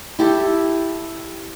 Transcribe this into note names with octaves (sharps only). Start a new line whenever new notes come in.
E4 G4 A4